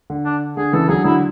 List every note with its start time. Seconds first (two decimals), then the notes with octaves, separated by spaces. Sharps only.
0.10 D3
0.25 D4
0.57 D3 G#4
0.73 C#3 E3 A4
0.88 D3 F#3 G#4
1.04 D3 F#3 E4